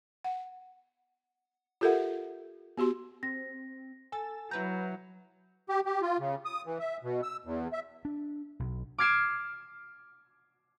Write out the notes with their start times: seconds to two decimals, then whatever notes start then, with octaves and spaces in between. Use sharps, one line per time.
0.24 F#5
1.81 F4 G4 A4 A#4 E5 F#5
2.78 B3 F#4 G4 C6
3.23 C4 A#6
4.12 A4 G#5 E6 A6
4.51 F#3 E4 B4 A#5 G6
5.69 G4
5.85 G4
6.01 F4
6.19 C#3
6.45 D#6
6.66 E3
6.79 E5
7.03 B2
7.23 E6
7.45 E2
7.73 E5
8.05 D4
8.60 B1
8.98 D6 F6 G#6 C7 D7 E7